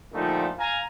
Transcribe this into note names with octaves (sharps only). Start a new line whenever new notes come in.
A#2 D3 F3 G3 A3 D#4
F5 G#5 A#5